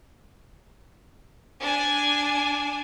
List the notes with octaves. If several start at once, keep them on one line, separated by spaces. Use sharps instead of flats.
D4 G#5